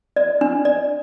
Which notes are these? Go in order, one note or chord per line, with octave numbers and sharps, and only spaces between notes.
D5
D4
D5